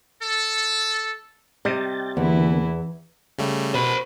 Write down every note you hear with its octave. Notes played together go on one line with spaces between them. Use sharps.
A4
C3 G3 D#5 G5 A6
E2 D3 E3 A#3 B3 E4
C#3 G3 A3
B2 C5 B5